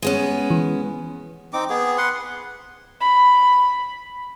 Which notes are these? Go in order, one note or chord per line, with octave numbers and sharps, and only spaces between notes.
G#3 B3 C#4
E3
C4 D#4 D6
B3 G#4
B4 F#5 C6
B5